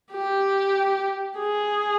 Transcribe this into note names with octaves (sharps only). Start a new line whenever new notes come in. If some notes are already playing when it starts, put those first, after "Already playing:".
G4
G#4